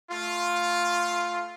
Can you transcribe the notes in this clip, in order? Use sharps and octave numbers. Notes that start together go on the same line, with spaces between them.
A3 F4